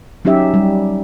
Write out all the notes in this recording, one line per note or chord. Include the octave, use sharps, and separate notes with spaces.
F#3 C#4 D#4 G4 E5
G3